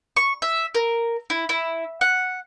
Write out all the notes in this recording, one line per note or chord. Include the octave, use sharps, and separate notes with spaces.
C#6
E5
A#4
E4
E4
F#5